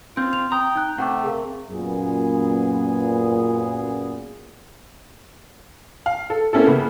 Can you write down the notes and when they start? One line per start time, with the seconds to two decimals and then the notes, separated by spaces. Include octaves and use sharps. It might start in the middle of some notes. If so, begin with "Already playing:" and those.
0.17 C4 F4 G6
0.33 F7
0.52 G5 A#5 D#6
0.75 D#4 F#6
0.98 C3 A3 F#5 G5 D6
1.24 G#4 A#4 F5
1.69 F#2 A#2 B3 G#4
6.06 F5
6.30 A4
6.53 A#3 C4 C#4 E4 A4
6.66 C#3 A#3 B3